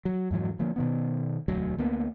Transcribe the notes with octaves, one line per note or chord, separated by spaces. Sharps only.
F#3
F2 G#2 E3 F#3
D3 F3 A#3
B2 D#3 B3
E1 D2 F#3
D2 A#3 B3